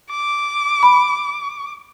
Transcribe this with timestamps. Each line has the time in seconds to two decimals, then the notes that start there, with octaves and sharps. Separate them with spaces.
0.10 D6
0.83 B5